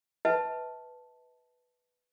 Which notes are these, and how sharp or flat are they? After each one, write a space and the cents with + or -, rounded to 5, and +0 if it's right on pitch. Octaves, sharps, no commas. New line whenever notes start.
B4 +0 E5 -45 A5 +0